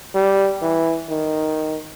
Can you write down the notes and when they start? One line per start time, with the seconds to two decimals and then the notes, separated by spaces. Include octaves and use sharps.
0.15 G3
0.62 E3
1.10 D#3